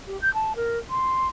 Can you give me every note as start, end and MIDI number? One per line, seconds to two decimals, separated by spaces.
0.07 0.20 67
0.22 0.33 91
0.34 0.53 81
0.56 0.79 70
0.90 1.28 84